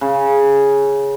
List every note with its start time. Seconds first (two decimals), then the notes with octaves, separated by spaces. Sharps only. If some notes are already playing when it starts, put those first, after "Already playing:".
0.01 C#3